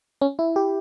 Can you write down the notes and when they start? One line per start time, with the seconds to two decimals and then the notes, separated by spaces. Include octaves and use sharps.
0.21 C#4
0.39 E4
0.56 G4